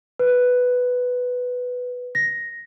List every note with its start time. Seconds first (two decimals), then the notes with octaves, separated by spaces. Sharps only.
0.19 B4
2.15 A#6